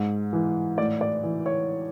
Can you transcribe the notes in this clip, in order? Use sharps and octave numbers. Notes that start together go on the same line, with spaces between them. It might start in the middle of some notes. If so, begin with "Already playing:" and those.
Already playing: G#2 G#3
E3
A2 D5
D5
E3
C#5